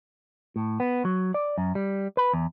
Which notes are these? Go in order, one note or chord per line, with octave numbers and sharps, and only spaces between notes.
A2
B3
F#3
D5
F#2
G3
B4
E2